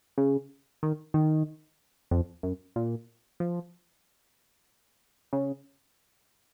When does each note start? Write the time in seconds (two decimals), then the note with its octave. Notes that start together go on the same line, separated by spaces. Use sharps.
0.18 C#3
0.83 D#3
1.14 D#3
2.11 F2
2.43 F#2
2.76 A#2
3.40 F3
5.33 C#3